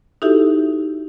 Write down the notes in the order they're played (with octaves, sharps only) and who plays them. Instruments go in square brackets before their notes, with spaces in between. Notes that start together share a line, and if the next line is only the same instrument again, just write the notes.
[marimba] D#4 E4 F#4 G4 A4 E5